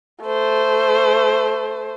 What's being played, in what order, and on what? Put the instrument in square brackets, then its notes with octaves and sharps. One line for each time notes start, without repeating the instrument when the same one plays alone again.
[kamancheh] A3 C5